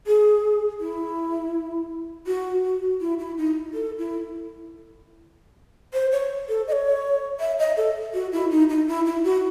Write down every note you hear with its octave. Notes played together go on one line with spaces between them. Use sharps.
G#4
E4
F#4
F#4
E4
E4
D#4
A4
E4
C5
C#5
A4
D#5
C#5
E5
D#5
A4
F#4
E4
D#4
D#4
E4
E4
F#4